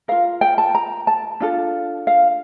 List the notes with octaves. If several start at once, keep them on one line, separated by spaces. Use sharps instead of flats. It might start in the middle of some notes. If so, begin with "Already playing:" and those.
F4 A#4 F5
G5
A5
A#5
A5
D4 F4 A4
F5